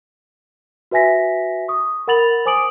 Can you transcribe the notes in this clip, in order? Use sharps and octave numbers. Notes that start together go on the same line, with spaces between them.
F#4 B4 E5 G#5 A#6 B6
C#6 D#6
A#4 F#5 B5 A6 F7 F#7
C5 G#5 D6 D#6 D7 F#7